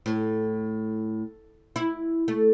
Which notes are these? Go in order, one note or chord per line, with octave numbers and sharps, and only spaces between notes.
A2
E4
A3